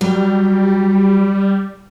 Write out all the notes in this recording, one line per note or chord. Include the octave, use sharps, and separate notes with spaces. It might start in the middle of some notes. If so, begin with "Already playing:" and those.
F#3 G3